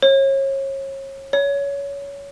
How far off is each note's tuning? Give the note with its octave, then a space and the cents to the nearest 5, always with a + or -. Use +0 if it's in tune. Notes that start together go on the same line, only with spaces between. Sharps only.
C#5 -35
C#5 +20